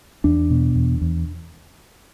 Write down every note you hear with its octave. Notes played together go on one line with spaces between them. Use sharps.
E2 D4
B2
E2
E2